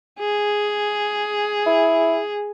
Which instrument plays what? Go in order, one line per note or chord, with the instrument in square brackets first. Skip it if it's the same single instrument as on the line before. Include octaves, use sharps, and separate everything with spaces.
[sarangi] G#4
[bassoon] E4